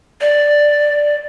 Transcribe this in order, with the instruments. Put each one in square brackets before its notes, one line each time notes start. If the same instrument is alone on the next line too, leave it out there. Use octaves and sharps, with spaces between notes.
[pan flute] D5